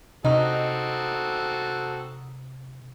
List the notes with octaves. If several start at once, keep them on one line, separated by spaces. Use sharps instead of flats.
C3 C4 D#4 F#4 A4